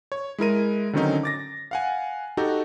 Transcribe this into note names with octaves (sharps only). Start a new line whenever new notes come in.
C#5
G#3 E4 A#4 D#7
D3 D#3 F#3 C4 C#4 D#4
D6 A6 A#6
F5 F#5 G#5
D#4 F#4 G4 A4